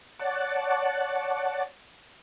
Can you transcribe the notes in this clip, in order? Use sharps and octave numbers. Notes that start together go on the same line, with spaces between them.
C#5 D5 F#5 A5